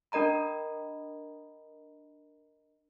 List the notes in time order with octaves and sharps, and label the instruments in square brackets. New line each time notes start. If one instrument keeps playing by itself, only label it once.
[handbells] D4 A#4 D#5 A#5 B5